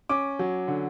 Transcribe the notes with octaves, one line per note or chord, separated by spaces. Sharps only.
C#4 D6
F#3
D3